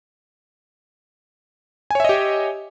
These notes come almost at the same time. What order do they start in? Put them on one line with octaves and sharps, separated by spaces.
G#5 C#5 E5 D#5 G4